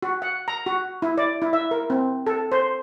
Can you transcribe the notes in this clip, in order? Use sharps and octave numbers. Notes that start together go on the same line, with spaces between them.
F#4
F#5
A#5
F#4
E4
D5
E4
E5
A#4
C4
A4
C5